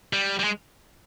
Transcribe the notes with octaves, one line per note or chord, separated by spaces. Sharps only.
G3
G3
G#3